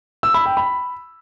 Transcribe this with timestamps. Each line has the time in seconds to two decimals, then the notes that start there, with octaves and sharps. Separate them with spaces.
0.23 E6
0.34 B5
0.46 G5
0.57 B5